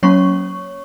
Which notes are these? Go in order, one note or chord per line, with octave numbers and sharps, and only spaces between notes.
F#3 A#3 C#4 C#5 C#6